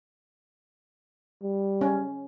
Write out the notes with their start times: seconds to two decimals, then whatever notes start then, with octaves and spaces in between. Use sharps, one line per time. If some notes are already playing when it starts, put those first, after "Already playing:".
1.42 G3
1.81 C#4